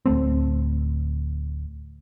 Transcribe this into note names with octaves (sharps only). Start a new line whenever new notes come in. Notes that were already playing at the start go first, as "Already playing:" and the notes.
D1 D2 A3 C4